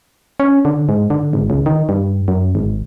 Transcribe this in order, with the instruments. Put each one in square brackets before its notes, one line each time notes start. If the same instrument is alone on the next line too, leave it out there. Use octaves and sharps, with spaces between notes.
[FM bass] C#4
D3
G#2
D3
G#1
C#2
D#3
G2
F#2
G#1